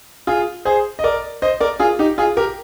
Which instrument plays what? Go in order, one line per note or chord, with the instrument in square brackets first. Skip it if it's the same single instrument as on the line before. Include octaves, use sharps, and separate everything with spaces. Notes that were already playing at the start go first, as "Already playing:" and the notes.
[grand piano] F4 G#4
G#4 C5
D#5
A#4 D5
C5 D#5
A#4 D5
F4 G#4
D#4 G4
F4 G#4
G4 A#4